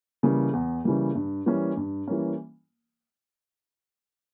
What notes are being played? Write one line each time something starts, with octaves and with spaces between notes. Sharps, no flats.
C#3 E3 G3 A#3
E2
C#3 E3 G3 A#3
G2
E3 G3 A#3 C#4
G2
E3 G3 A#3 C#4